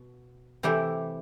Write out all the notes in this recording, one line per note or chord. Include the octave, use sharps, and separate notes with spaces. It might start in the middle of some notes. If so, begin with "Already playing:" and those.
Already playing: B2
C3 E3 A3 E4 G4